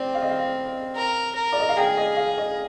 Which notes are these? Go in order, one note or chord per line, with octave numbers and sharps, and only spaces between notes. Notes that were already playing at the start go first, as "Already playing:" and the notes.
Already playing: C4 D5
F5
D#5
F5
A#4
A#4
D5
D#5
F5
G#4 G5
D#5
F5
D#5